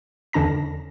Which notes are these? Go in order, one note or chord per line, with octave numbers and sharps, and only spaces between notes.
E2 D3 C#4 A5 A#6